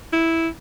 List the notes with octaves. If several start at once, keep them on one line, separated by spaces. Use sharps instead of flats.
E4